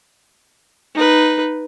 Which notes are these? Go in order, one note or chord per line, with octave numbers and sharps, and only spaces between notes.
D#4 B4